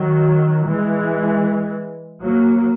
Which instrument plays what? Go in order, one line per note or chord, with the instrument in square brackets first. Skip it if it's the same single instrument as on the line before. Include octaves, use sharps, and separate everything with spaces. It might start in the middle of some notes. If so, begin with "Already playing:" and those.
Already playing: [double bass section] D#3 F#3
E3 G#3
F#3 A#3